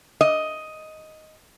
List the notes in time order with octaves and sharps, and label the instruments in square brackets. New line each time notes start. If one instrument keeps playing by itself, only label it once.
[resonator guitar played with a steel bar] D#5